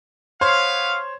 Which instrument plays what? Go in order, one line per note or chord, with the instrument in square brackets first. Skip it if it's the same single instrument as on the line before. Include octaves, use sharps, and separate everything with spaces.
[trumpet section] B3 F5 [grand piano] C5 C#5 C6